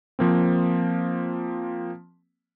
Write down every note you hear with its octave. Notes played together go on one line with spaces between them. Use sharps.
F3 A#3 C4